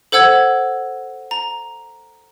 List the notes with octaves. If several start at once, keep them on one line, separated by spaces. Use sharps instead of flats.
A4 C5 F#5 E6 G#6
A#5